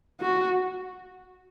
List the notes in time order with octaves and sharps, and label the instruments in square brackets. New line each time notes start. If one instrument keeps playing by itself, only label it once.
[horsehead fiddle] F#4